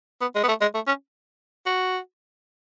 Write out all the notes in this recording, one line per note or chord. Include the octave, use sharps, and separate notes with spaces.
B3
G#3
B3
A3
G#3
A3
C#4
F#4